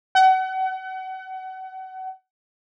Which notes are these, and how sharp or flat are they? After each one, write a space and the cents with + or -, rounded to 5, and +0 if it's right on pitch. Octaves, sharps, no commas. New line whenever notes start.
F#5 +30